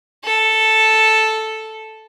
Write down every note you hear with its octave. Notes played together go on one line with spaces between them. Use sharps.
A4